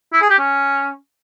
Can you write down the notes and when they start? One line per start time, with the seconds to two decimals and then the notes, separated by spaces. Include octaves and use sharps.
0.13 E4
0.21 G#4
0.30 G4
0.39 C#4